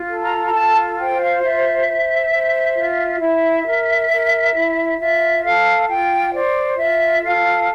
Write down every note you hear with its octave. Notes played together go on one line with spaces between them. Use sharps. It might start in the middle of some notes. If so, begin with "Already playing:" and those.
Already playing: F4
A4
A#5
A#5
F4 A5
C5 G5
F5
F4 E5
C5
C5
F4
E4 E5
A#4
A#4
E4
F4 E5
A4 F5
F4 G5
C5 D5
F4 E5
A4 F5